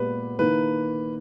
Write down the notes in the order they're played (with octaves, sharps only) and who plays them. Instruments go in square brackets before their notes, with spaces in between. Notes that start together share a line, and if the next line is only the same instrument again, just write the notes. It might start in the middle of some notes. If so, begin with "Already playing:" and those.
Already playing: [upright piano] A#2 G#3 B3 G4 [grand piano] B4
[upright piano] D#3 A#3 E4 [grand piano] B4